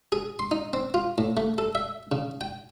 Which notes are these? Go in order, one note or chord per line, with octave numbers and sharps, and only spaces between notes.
G#4
C6
D#4
C4
F4
A2
A3
A4
E5
C#3
G5